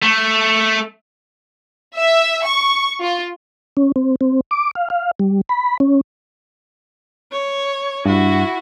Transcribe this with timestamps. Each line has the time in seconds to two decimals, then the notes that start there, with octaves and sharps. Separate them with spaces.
0.02 A3
1.97 E5
2.44 C#6
3.02 F4
3.77 C#4
3.96 C4
4.21 C4
4.51 D6
4.75 F5
4.90 F5
5.20 G3
5.49 B5
5.80 C#4
7.32 C#5
8.06 G2 E4 F#4